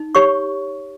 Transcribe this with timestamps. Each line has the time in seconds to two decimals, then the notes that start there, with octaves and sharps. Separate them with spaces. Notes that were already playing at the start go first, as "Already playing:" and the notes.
Already playing: D#4
0.15 G4 C#5 C#6